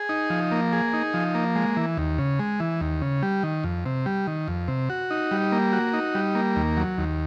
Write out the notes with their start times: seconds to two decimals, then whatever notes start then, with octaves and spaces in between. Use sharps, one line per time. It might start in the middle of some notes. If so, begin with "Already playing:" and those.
Already playing: G#4
0.09 D#4
0.30 F3
0.51 A#3
0.73 G#4
0.93 D#4
1.14 F3
1.35 A#3
1.56 G#3
1.77 E3
1.97 D#2
2.18 C#3
2.39 G#3
2.60 E3
2.81 D#2
3.01 C#3
3.22 G3
3.43 D#3
3.64 F2
3.85 C3
4.06 G3
4.27 D#3
4.48 F2
4.68 C3
4.90 F#4
5.11 D#4
5.31 G3
5.52 A#3
5.73 F#4
5.93 D#4
6.15 G3
6.35 A#3
6.56 D#2
6.77 F#3
6.98 D#2